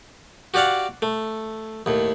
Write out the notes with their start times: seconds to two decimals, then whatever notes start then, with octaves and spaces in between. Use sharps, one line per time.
0.54 F#4 G4 D5 F5 F#5
1.02 A3
1.86 D#2 A2